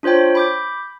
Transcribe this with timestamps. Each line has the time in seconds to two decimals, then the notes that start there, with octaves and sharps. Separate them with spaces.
0.03 D4 F4 C5 C#5 G5
0.35 B5 D6 G6